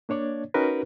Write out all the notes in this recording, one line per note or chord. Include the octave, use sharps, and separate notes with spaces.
A#3 D4 C#5 D5
C#4 D#4 F#4 A#4 B4